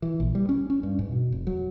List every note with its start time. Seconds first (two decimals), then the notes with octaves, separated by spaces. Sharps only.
0.02 E3
0.20 A#1
0.35 G3
0.49 C#4
0.70 C#4
0.83 G2
0.99 G#2
1.12 B2
1.32 F1
1.47 F#3